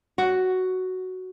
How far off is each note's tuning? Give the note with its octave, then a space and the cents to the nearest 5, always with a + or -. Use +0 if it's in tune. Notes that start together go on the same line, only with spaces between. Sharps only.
F#4 +5